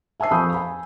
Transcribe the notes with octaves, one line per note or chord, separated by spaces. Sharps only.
E5 G#5 A5 E6 C7
F2 F5 B5 C#6 D#6 G6
G#5 B5